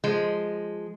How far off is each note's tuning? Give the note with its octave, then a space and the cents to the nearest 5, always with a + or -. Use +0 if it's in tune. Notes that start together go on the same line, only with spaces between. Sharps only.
F3 +0 G#3 +0